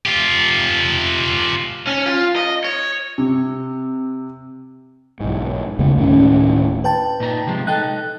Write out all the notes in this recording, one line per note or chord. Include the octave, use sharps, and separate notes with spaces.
F4 G4
C#4
F4
D#5
C#5
C3
B1 G#2
F#2 C#3 G#3 B3
D1 A2 D#3 C#4
B4 G5 A5
A#2 D#4 A#5
C3 F3 G#3
D#4 A4 G5 F#6